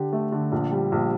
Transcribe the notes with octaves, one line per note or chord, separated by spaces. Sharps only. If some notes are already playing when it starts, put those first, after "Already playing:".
Already playing: D3 G4
A3
D3
A#1
G3
A#1